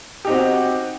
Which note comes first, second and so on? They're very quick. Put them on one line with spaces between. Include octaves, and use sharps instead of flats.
G4 D#4 C4 F#4